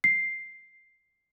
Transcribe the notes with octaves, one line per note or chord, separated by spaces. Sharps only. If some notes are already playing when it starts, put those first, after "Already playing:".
C7